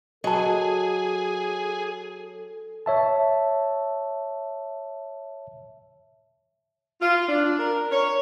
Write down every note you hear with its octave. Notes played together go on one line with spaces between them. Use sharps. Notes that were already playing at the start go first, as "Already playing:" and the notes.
F#3 G#4 A4 D#5 A5
C#5 E5 A5
F4
D4
A#4
C#5